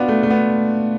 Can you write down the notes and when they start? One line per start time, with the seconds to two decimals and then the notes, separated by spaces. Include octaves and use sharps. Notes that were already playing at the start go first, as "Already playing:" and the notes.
Already playing: B3 D4 F4 F#4
0.08 A3
0.23 A3
0.30 B3